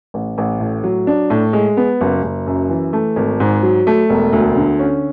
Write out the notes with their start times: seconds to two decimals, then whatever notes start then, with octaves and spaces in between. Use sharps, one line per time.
0.14 A1
0.38 A1
0.60 A2
0.84 F#3
1.07 D4
1.30 A2
1.53 G#3
1.77 B3
2.01 F#1
2.23 F#1
2.47 F#2
2.70 E3
2.93 A3
3.16 G#1
3.40 G#2
3.63 F#3
3.87 A3
4.09 E1
4.33 D2
4.57 D3
4.79 C#4